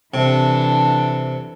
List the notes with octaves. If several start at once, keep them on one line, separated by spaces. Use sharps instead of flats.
C3 E3 D4 A4